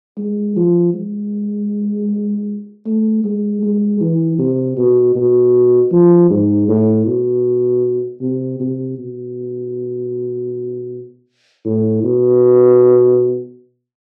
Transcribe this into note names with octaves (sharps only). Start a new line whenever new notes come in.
G#3
F3
G#3
A3
G#3
G#3
E3
C3
B2
B2
F3
G#2
A2
B2
C3
C3
B2
A2
B2